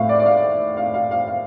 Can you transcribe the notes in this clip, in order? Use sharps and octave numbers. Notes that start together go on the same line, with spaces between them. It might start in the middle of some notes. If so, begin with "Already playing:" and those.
Already playing: A2 A3 F5
D5
D5
F5
F5
F5
F5
F5